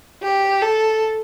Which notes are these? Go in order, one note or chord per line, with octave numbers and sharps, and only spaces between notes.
G4
A4